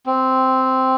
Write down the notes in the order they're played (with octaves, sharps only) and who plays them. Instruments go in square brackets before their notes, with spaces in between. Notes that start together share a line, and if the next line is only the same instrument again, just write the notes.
[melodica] C4